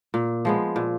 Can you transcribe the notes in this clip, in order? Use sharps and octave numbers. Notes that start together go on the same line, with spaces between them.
A#2
F3 G#3 B3
A#2